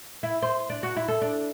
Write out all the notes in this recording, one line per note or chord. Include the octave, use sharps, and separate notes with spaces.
E4
C5
D4
F#4
E4
A4
D4